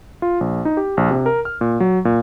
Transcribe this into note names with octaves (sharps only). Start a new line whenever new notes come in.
F4
A#1
D#4
G4
A#1
C3
A#4
F6
A#2
F#3
A#2